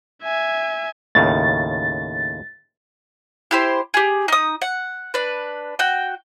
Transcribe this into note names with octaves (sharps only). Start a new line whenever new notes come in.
E5 G#5
D#2 A2 C#3 A6
E4 G4 C5
G4 G#4
D#4 D#6
F#5
D4 B4
F#4 G5